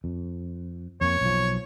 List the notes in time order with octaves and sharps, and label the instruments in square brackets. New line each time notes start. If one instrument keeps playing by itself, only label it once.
[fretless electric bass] F2
[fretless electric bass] F2 A#3 [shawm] C#5
[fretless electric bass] B1 F3